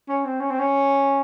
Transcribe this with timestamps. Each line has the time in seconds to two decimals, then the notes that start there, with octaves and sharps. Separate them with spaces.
0.08 C#4
0.25 C4
0.40 C#4
0.51 C4
0.60 C#4